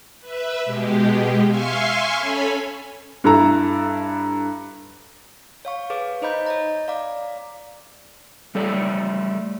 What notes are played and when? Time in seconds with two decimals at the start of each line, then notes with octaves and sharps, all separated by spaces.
0.20 B4 E5
0.65 B2 G#3 G4
1.46 E5 F5 G#5 C6 C#6 F6
2.16 C#4 A4 C#5 G#5 B5
3.24 G2 E4 A4 A#5
5.65 C#5 F5 C#6
5.90 G#4 B4 C#5 F5 D6
6.22 D#4 C5 D#5 A#5 B5 G6
6.46 C#5 D#5 A#5
6.88 D5 F5 A#5 D6
8.55 G3 A3 A4 C#5 D5